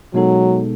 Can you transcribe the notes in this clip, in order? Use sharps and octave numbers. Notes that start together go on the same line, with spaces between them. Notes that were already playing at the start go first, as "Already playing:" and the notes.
B2 F#3 G#3 B3 D#4 A4